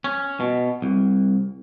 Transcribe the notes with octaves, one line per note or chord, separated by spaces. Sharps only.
C#4
B2
C2